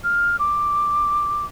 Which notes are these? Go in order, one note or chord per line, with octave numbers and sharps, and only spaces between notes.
F6
D6